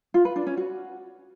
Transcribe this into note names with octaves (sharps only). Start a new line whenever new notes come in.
F4
B4
D4
C#4
F#4